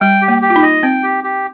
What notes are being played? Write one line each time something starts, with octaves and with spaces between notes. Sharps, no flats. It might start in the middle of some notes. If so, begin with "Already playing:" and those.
G3 G5
G4
A#3
G4
F4
D#4
D#5
C4 G5
G4
G4